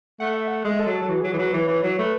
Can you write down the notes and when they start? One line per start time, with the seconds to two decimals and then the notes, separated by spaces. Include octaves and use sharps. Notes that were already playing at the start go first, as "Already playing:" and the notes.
0.20 A3 F#5
0.34 E5
0.48 F#5
0.65 G#3 E5
0.79 A4
0.87 F#3
0.94 A4
1.02 F#3
1.09 E3 F#4
1.21 G#4
1.24 F#3
1.32 E3 G#4
1.39 F#3 B4
1.54 E3 C#5
1.68 E3
1.83 F#3
1.98 A3 B4